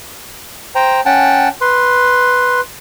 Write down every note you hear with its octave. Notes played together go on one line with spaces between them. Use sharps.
C5 G5 A#5
C#4 F#5 G5 A5
B4 C6